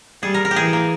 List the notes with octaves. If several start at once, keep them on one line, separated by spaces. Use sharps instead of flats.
G3 G#4
A#4
A#4
G4
E3 G#4
A#3